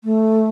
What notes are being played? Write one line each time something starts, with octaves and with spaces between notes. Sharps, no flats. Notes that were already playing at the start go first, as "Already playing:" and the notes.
A3